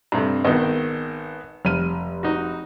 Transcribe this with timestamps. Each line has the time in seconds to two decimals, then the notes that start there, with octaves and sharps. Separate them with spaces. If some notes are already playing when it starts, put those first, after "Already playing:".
0.12 G2 C3 A3
0.45 G#1 D#3 B3 D#5
1.65 F1 F6 D#7
2.23 D#4 F#4